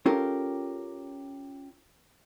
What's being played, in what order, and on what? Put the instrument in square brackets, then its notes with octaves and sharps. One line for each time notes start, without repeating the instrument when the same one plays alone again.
[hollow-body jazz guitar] C#4 F4 G4 A4 A#4